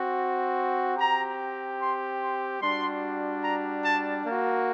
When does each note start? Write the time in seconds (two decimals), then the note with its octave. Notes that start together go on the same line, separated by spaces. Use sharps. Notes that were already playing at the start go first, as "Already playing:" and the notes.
Already playing: C4 F#4
0.97 C4 G4 A#5
1.80 C6
2.21 C6
2.62 G3 D4 F#4 C6
3.43 A#5
3.85 A5
4.26 A#3 F#4